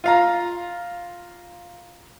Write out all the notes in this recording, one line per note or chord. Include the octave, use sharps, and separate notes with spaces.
F4 F5 A#5